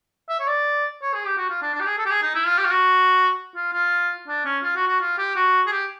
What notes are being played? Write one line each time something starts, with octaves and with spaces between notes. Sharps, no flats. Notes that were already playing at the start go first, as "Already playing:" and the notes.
E5
C#5
D5
C#5
G#4
G4
F#4
F4
D4
D4
G4
G#4
A4
G4
G#4
D#4
E4
F4
G4
F4
F#4
F4
F4
D4
C#4
F4
F#4
F#4
F4
G4
F#4
G#4
G4